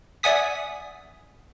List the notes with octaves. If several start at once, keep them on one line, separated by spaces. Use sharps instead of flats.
D5 E5 F#5 G#5 D#6 B6